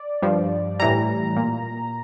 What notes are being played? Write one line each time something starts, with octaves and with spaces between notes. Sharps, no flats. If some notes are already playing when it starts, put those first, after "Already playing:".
Already playing: D5
G2 F3
A2 E3 G3 A#5
A#2